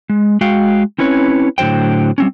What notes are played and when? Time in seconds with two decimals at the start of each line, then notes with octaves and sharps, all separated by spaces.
0.10 G#3
0.41 G#3 F#4 F5 G5
0.98 C4 C#4 E4 B4 C#5
1.58 A2 D3 F#3 C5 G5
2.18 G3 C4 C#4